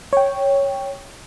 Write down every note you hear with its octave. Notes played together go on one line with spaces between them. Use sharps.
C#5 G5